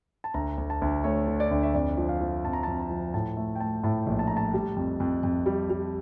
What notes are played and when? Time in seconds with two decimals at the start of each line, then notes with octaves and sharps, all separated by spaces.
0.24 A5
0.34 D2 A#5
0.58 D2
0.70 A5
0.82 D2
1.04 A3 C#5
1.27 D3
1.40 D5
1.51 D2
1.63 E5
1.74 F2 D5
1.98 F3
2.09 F5
2.21 F3
2.45 F2 A5
2.53 A#5
2.63 F2 A5
2.80 A#5
2.90 F3
3.14 A2 A5
3.37 A3
3.55 G5
3.60 A3 A5
3.83 A2 A5
4.06 A#1
4.19 A5
4.27 A3 A#5
4.37 A5
4.54 G3
4.76 F2
5.00 F2
5.23 F2
5.46 G3
5.70 G3